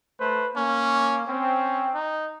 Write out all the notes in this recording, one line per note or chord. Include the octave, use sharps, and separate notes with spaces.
A3 B4 C5
A#3 C#4
C4 C#4
D#4